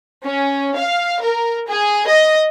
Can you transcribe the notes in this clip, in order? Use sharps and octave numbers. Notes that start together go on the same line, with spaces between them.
C#4
F5
A#4
G#4
D#5